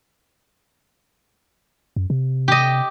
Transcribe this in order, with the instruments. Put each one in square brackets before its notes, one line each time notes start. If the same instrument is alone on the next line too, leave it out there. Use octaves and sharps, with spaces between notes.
[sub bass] F#2
C3
[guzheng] G4 D#5